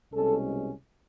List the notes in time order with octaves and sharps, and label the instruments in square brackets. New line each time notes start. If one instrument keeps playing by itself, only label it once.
[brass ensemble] C2 B2 G#3 C#4 A4